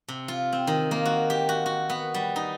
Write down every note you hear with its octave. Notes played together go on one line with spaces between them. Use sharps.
C3
F4
C4
D#3
A#3
F#4
G4
F#4
F#4
B3
G3
D#4